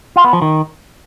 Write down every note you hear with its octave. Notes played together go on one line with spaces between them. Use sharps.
F4
B3
F3
D#3